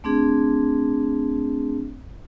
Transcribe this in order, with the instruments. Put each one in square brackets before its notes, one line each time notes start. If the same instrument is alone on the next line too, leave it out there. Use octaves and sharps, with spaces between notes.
[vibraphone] A3 C4 D4 G#4